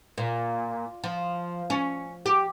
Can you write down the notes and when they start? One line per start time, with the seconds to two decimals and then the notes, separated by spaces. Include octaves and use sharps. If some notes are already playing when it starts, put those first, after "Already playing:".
0.18 A#2
1.04 F3
1.70 C#4
2.26 G4